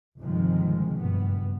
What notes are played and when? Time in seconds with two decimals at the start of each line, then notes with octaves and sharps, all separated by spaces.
0.18 G1 F2 C3 D#3 F3 G#3
0.94 F#1 G2 B2 B3